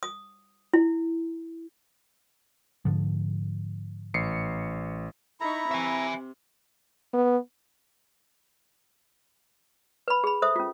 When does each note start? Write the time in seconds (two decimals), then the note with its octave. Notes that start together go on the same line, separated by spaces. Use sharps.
0.03 D#6
0.73 E4
2.85 G#2 D3 F3
4.14 A1 C7 C#7
5.41 D#4 E4 A#5 B5 C#6
5.71 C3 E5 G#5
7.13 B3
10.08 B4 B5
10.24 G#4 B5
10.42 A4 C5 E5 D#6
10.56 C#4 F4